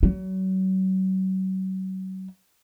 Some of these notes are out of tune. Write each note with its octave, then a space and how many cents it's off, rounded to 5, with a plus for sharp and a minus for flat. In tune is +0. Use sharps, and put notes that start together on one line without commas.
F#3 +35